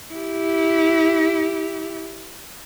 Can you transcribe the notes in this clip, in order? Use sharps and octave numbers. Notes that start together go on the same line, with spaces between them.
E4 G4